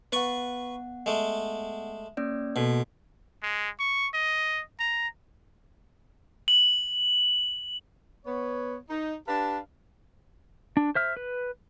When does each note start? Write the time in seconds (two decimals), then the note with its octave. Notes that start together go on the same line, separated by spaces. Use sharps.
0.12 B3 B4 F#5 C#6
1.06 G#3 A3
2.17 A#3 C#4 D5
2.56 B2 A#3 F#4 A4
3.43 G#3
3.79 C#6
4.14 D#5
4.79 A#5
6.48 F#7
8.25 B3 C#5
8.89 D#4
9.27 D4 G4 B4 F5 A5
10.77 D4
10.95 C5 E5 F6
11.17 B4